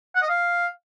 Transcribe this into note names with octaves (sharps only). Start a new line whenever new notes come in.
F#5
D#5
F5